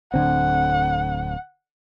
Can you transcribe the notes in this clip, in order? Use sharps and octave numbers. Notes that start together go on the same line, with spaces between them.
D1 D3 C4 F#5